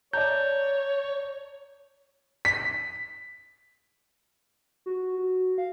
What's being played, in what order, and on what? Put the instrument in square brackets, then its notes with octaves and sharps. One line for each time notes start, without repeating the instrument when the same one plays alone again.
[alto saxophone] C#5 [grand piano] D5 A5 A#5 [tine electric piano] G6
[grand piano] B6
[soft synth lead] F#4
F#4
F5